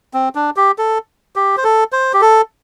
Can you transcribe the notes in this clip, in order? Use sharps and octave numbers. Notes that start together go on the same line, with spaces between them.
C4
D4
G4
A4
G4
C5
A4
C5
G4
A4